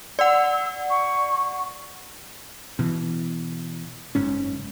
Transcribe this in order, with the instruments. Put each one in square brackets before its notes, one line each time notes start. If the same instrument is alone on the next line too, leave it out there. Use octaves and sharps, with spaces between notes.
[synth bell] D5 F#5 [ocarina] E6
[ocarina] C#6
[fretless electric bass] B2 E3
F#1 G#2 C#4